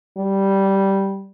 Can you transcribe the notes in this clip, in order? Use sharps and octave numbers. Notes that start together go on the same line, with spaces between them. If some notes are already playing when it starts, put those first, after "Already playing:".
G3